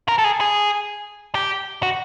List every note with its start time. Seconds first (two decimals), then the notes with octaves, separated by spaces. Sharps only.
0.08 A#4
0.18 A4
0.24 G#4
0.41 G#4
1.35 G4
1.83 F#4